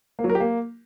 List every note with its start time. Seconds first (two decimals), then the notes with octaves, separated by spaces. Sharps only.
0.19 A#3
0.24 F#3
0.30 A#4
0.35 G4
0.40 A#3